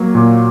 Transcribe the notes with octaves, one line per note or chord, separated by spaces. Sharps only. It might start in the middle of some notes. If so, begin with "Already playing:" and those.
Already playing: F#3 A#3
A#2